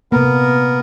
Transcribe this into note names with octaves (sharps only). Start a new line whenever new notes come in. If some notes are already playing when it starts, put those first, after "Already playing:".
C3 A#3 B3 A#4